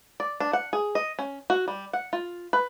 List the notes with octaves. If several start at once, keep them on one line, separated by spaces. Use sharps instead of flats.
D5
D4
F#5
G#4
D#5
C#4
F#4
G3
F#5
F4
B4